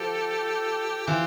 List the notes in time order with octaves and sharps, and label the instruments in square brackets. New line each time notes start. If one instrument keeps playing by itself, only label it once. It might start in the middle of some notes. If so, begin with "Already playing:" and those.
Already playing: [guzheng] F3 [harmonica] G4 A4
[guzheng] E3 [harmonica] F4 G4